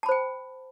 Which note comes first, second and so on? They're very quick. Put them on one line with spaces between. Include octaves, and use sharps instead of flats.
A5 B5 C5 G5